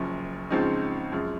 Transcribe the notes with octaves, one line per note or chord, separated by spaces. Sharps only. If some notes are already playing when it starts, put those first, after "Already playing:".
Already playing: F#1 F#2 F3
C#2 C#3 F3 C4 D#4
F#2 F3 G#3